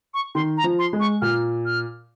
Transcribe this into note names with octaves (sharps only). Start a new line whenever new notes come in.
C#6
D#3 C6
A#5
F3
C6
G#3
C#6
A#2 F6
F6